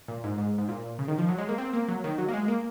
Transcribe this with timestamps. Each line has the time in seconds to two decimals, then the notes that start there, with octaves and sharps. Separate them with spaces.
0.08 A#2
0.24 G#2
0.38 G#2
0.58 G#2
0.69 A#2
0.99 C#3
1.08 D#3
1.18 F3
1.29 F#3
1.38 G#3
1.49 A#3
1.58 C4
1.73 A#3
1.88 F#3
2.04 D#3
2.18 F#3
2.29 A#3
2.34 G#3
2.48 A#3